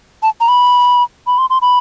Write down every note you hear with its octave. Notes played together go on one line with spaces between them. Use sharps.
A5
A#5
B5
B5
C6
C6
B5